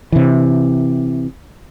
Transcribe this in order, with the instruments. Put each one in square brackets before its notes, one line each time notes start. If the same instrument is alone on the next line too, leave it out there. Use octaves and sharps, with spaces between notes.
[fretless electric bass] C3 E3